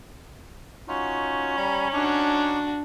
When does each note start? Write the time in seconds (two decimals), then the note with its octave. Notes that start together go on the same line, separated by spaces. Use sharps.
0.88 C#4 D#4 F4 F#4
1.57 G3 A#5 B5
1.94 D4 D#4 F#4 C#6 D6